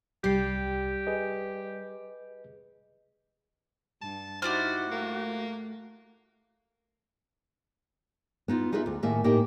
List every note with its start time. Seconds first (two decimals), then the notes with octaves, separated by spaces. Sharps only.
0.24 C2 G3 G4 C7
1.07 G#4 B4 D#5
4.02 G2 A5
4.42 D#4 E4 F#4 G4 C5 D5 F6
4.92 A3 A#3
8.48 B3 D#4 F4
8.73 D#4 F4 G#4 B4 E5
8.86 D2
9.03 A2 D#3 A#3 E5 G#5
9.24 A2 A#3 D#4 G4 G5